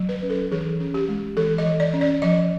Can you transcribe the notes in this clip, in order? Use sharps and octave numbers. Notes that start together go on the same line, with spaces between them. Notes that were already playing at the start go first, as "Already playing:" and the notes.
Already playing: F#3
B4
C#4
A4
E3 G#4
C#4
G4
G#3
E3 A4
D#5
E3
D5
C#4
D5
F3 D#5